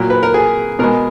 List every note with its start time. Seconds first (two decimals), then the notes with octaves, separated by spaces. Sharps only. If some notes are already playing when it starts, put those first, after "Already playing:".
Already playing: A#2 F#3 A#4
0.10 B4
0.23 A#4
0.34 G#4
0.79 B2 G#3 A#4